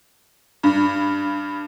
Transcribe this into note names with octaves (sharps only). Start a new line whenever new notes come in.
G2